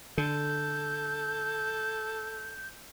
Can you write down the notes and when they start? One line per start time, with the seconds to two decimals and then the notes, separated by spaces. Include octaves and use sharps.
0.18 D3 A4 G6